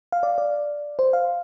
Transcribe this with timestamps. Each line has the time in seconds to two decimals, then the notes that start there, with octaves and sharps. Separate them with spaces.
0.12 F5
0.23 D5
0.38 D5
0.99 C5
1.13 F5